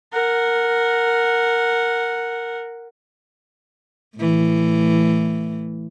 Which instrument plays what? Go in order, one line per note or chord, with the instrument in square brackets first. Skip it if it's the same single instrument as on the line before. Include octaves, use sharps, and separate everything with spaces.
[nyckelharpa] A#4 F#5
[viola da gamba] A2 E3